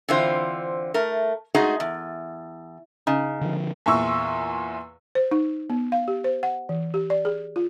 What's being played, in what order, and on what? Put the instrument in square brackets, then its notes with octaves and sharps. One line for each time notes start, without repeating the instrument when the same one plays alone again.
[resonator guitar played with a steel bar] D3 E3 C4 F4 C5
A3 A#4
G#3 A3 D#4 F#4 G#4 D#5
E2
[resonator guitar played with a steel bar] C#3 [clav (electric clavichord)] D#4
[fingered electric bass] D3 F3
[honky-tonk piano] E2 A#2 E4 C#6 E6
[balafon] C5
D#4
B3
F5
G4
C5
F#5
E3
G4
D5
G#4
F4